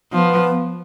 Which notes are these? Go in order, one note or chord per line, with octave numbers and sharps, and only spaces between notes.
F3 B3